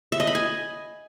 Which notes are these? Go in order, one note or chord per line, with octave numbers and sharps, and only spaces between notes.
E5
D#5
B5
G#5